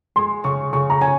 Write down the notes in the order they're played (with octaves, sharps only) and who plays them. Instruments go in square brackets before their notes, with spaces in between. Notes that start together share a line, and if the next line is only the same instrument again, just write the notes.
[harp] G#3 [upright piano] C6
[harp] C#3 [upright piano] C#6
[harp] C#3 [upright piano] C#6
[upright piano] A#5
[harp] C#4 [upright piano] G#5